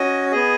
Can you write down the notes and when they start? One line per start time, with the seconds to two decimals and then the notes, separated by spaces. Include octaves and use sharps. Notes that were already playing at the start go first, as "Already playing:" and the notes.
Already playing: C#4 F#4 D#5
0.32 B3 G#4 D#5